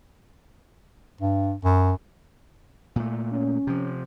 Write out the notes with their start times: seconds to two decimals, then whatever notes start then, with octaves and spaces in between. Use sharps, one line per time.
1.21 G2
1.64 F#2
2.96 A#2 A3
3.31 C#4
3.67 C3 F3